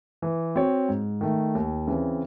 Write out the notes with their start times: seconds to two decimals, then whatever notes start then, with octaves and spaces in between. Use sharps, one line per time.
0.22 E3
0.56 C4 F#4 C#5
0.89 G#2
1.21 D#3 A3
1.55 D#2
1.87 C#3 E3 C4